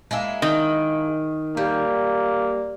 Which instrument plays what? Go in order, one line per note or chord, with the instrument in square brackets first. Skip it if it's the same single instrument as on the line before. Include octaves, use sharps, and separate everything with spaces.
[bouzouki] G#3 A#3 E4
[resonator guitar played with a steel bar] D#3
[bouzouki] G3 [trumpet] A#3